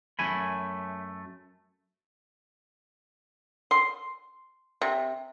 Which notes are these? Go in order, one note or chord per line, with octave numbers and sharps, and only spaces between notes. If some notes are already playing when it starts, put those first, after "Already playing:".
F#2 A3 G#5 B5
C6
C3